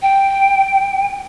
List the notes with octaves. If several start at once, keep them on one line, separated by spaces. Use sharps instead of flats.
G5